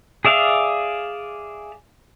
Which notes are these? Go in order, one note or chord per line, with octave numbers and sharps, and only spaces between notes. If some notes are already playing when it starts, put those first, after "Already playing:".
G#4 D5 E5 F5